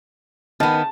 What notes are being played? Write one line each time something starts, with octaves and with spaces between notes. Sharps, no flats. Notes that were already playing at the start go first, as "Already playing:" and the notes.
D#3 B3 A5